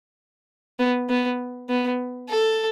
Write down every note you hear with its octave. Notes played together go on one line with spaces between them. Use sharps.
B3
B3
B3
A4